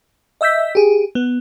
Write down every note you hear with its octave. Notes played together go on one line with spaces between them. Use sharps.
D#5 E5 E6 G6 B6
G4 G#4
B3